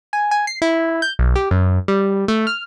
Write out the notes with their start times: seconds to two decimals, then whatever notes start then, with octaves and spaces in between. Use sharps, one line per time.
0.13 G#5
0.31 G#5
0.47 C7
0.62 E4
1.02 G6
1.19 B1
1.36 G4
1.51 F#2
1.88 G3
2.28 A3
2.47 F6